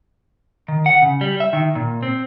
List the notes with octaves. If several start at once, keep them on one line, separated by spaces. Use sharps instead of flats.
D#3
F#5
C#3
G3
E5
D#3
A#2
C4